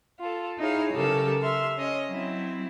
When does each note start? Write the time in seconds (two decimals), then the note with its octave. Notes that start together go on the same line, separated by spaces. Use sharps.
0.19 F4 A4
0.58 D#4 E4 G#4 C#5 F5
0.93 C#3 F#3 G4 A4 A#4
1.41 E5 C6 F6
1.76 C#4 D#5
2.08 F#3 C4 E4